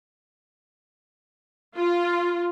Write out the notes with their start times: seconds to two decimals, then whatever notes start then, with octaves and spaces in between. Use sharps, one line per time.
1.76 F4